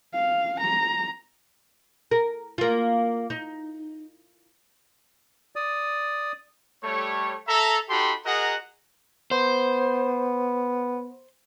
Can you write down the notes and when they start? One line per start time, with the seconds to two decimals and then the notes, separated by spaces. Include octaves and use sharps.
0.14 F5
0.61 A#5
2.11 A#4
2.58 A#3 F4
3.30 D#4
5.56 D5 D#6
6.83 G3 A3 C#5
7.48 A4 E5 A#5
7.89 D#4 F#4 G4 A4 B5 C6
8.26 F#4 G#4 A#4 D#5 F#5 A#5
9.31 B3 C5